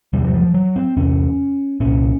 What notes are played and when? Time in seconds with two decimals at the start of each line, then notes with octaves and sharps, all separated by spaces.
0.13 E2 C3 G3
0.25 F#3
0.34 F3
0.54 F#3
0.76 C4
0.97 E2 C3 C#4
1.80 C2 A#2 C#4